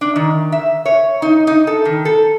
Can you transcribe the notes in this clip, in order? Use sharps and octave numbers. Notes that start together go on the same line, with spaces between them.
D4
D#3
E5
C#5
D#4
D#4
A4
D#3
A4